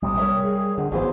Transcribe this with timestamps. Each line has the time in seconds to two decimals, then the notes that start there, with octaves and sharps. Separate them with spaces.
0.03 A1 C3 G3 D#6
0.17 G3 A#4 C#5 E5
0.43 G#4
0.78 F2 D3
0.92 G#1 E3 F#3 B3 F4 G#4 C5